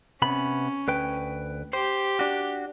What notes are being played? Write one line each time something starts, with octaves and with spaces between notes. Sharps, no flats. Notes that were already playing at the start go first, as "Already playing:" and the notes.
C3 B3 C#4 B5
D2 B4 G5
G4 C5
D4 F#4